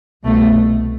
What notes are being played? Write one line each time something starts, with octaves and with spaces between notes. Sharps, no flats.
C2 B2 A3